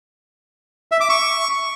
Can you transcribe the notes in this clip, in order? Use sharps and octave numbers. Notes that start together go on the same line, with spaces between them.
E5
D6
C#6